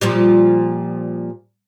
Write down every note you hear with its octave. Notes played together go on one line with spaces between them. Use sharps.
A#2 F3 G3